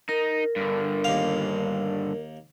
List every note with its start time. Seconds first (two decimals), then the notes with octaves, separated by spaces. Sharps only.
0.09 D#4 A#4
0.56 G2 D3
1.04 D#2 F5